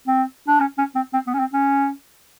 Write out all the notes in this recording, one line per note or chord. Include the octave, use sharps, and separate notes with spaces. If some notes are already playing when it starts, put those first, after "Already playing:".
C4
D4
C#4
C#4
C4
C4
B3
C#4
C4
C#4